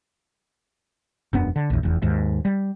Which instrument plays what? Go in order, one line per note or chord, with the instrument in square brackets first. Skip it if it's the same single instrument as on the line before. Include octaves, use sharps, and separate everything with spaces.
[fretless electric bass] E1 F#2 B3 D4
D3
A#1 E2
F1 E2
D#2 G#2
G3